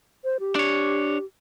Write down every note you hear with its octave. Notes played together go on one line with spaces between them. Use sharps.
C5
G4
D4 C#5